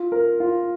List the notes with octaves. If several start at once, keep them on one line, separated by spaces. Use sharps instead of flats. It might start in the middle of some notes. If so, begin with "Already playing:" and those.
Already playing: F4
A#4
F4